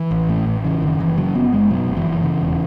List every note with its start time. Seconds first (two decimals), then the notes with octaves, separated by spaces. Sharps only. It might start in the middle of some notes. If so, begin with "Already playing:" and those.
Already playing: E3
0.11 A1
0.29 A2
0.46 A1
0.65 C#3 E3
0.82 F#1 D#3
0.99 F#1 E3
1.17 C#3 F#3
1.34 F#1 B3
1.53 F#1 G#3
1.70 B2 F#3
1.87 F#1
1.97 E3
2.06 F#1
2.23 C#3
2.41 E1